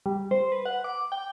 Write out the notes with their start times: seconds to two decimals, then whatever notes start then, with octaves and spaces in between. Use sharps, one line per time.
0.06 G3
0.31 C5
0.52 B4
0.65 F#5
0.84 D6
1.12 G5